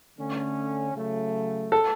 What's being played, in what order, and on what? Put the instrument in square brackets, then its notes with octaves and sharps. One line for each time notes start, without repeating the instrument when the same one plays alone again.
[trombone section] D3 A3 C#4
C#3 F#3 A3
[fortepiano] A4